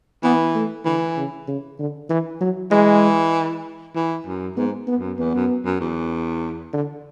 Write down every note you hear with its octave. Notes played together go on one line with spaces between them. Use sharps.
E3 B3
A3
D3 E3
C#3
C#3
D3
E3
F#3
E3 G#3
E3
F#2
G#2 B3
B3
F#2
E2 B3
F#2
F#2
E2
D3